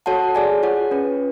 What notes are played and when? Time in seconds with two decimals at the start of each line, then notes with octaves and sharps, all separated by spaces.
0.06 F#4 A4 C#5 F#5 A5
0.35 G#4 D5 G#5
0.63 F4 G#4 C#5 F#5
0.91 C#4 F4 B4